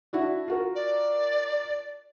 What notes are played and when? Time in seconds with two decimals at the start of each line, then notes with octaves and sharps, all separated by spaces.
0.13 D4 E4 F#4
0.48 F4 F#4 A#4
0.75 D5